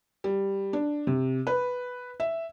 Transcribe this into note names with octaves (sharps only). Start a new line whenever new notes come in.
G3
D4
C3
B4
E5